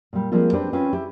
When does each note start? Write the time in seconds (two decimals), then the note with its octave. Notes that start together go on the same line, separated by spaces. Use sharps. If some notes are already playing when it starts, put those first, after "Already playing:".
0.13 A#2 G3
0.32 F3 G3 G#3 A#3 C4 F4
0.53 C4 D4 G4 B4 C5 D5
0.73 C4 C#4 F4 B4
0.93 E4 G4